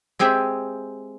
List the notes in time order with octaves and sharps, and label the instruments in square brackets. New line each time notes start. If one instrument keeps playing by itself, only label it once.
[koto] G#3 C4 G4 G#4 E5